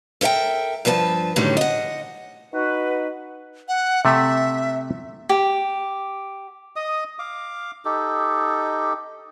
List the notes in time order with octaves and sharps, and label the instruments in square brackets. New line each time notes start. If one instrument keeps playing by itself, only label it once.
[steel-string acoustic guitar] A4 A#4 C5 E5 G5
G2 F3 B4 G#5 A5
F#2 A2 D3 D#3 G3
D#5 F#5
[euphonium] D#4 [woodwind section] F#4 B4
[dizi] F#5
[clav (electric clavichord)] C3 A3 [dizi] E5
[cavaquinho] G4
[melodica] D#5 D#6
F5 D6
D#4 G4 A4